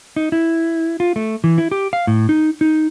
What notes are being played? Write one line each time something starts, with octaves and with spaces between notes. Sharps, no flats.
D#4
E4
F4
A3
E3
E4
G4
F5
A2
D#4
D#4